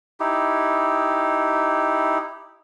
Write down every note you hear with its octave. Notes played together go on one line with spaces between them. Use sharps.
D#4 E4 G4